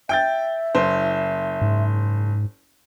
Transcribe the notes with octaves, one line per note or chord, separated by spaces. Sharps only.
E5 G5 G6 A6
F#1 C5
G#2